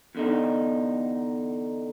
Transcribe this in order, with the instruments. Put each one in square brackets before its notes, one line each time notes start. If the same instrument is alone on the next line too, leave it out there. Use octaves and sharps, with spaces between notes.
[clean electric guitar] E2 D3 D#4